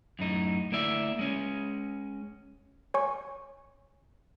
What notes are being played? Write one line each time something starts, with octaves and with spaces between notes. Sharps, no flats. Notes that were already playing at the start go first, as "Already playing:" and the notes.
F#2 A2 D#4
D2 A#3 E4 D5 E5
G#3 C#4
C#5 G#5 C#6